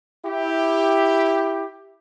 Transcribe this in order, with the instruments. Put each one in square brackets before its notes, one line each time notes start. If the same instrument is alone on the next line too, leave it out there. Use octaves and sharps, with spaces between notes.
[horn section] E4 G4